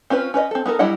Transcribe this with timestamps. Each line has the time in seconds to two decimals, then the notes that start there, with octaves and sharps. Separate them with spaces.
0.10 C4 C#4 F4 B4
0.34 C#4 B4 D5 D#5
0.51 C4 A4
0.65 B3 D#4 A4 A#4
0.79 F#3 G3 E4 D#5 F#5